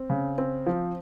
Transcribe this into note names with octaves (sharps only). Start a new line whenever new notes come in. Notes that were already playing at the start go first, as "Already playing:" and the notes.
Already playing: C4
C#3
C4
F3